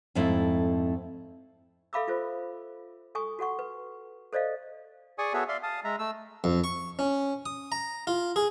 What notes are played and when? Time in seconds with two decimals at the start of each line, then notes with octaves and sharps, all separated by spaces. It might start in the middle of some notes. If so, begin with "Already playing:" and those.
0.15 F2 G#2 A3 C4 E4
1.93 A4 E5 F5 B5 D6 E6
2.08 F4 A4 C5
3.15 A4 G#5 C#6 D#6
3.39 F#4 A4 F#5 C#6
3.59 B4
4.33 A4 C5 D5 D#5 F5
5.18 G#4 D5 G#5 C#6 D#6
5.33 B3 F#4 G#4 A4 C#5 E5
5.48 D5 E5 F5 C6
5.63 F5 A5 D#6
5.84 G#3 E5 A#5
5.99 A3 E6
6.44 F2
6.64 C#6
6.99 C#4
7.46 D#6
7.72 A#5
8.07 F4
8.36 G#4